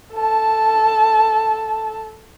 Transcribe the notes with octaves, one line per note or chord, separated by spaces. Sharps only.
A4 A5